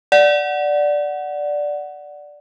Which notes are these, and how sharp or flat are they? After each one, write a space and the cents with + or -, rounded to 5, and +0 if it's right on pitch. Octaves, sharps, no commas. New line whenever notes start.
D5 +0 F#5 +0